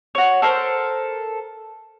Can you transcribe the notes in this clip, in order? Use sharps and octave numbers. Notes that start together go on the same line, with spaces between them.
F#4 C#5
A4 A#4 C5